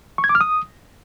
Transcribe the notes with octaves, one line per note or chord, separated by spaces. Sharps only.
C#6
G#6
D6
F6
D#6